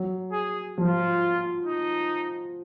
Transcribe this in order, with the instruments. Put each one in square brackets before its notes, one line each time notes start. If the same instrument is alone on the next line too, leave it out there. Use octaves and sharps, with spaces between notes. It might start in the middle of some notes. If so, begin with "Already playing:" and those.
Already playing: [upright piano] F#3
[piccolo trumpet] G#4
[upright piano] F3 [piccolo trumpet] F4
[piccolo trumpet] D#4